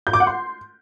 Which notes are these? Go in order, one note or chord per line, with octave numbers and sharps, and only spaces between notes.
G6
D6
F#5
C6